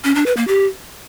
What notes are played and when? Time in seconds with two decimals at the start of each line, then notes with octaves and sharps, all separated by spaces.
0.05 C#4
0.15 D4
0.26 B4
0.37 A#3
0.48 G4